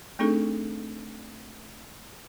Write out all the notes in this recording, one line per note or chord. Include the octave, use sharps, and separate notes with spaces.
A3 C4 D4 D#4 G#4 A4